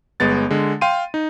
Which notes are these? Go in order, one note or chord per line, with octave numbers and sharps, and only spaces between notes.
G1 G#3 B3 A6
D3 G#3
F5 G5 C6 D#7
D#4